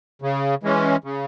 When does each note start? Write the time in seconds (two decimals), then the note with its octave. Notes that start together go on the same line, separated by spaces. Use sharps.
0.22 C#3
0.63 E3 G#3 C#4
1.04 C#3